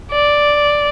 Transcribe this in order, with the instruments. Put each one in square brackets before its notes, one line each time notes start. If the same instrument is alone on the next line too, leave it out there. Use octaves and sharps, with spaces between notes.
[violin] D5